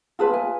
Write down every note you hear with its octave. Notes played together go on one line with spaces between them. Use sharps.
F4 G#4 B4 A5
G#5